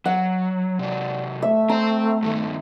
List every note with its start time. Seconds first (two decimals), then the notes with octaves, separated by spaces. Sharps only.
0.05 F#3 F#5
0.79 C3 F#3 D5
1.42 A3 E5
1.69 C4 C5 A#5
2.23 G2 D#3